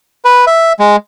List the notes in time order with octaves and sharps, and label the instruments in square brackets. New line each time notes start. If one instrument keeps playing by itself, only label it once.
[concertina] B4
E5
G#3